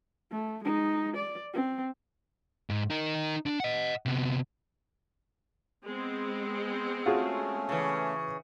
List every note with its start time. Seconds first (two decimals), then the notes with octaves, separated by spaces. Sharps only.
0.32 A3
0.64 G#3 D#4
1.17 D5
1.54 C4
2.70 G#2
2.90 D#4 A#4
3.46 D3 D4
3.60 D#5 F#5
4.06 C3 B3
5.84 G#3 B3 C4
7.06 A3 C#4 F4 F#4 G#4
7.69 C#3 E3